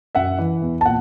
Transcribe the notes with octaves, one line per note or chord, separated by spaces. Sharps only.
F#2 E5 F#5
E3
E2
A5
A#2 F#5